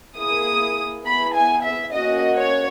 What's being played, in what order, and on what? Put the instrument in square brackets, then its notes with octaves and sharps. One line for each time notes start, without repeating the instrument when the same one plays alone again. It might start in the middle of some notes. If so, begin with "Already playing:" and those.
[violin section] A#3 E4 G#4 D#6
B3 E4 G#4 B5
G#5
E5
A#3 C#4 F#4 D#5
C#5